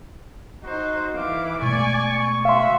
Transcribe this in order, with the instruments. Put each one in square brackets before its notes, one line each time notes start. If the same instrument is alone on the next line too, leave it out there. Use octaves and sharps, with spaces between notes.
[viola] D#4 C5 [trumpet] F#4
[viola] E3 D6 [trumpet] F5
[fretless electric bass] B2 G#3 A3 [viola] D5 G#5 [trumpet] C#6
[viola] F#4 E5 [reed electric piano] F5 C6